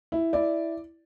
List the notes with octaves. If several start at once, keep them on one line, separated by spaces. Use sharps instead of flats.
E4
E4 D5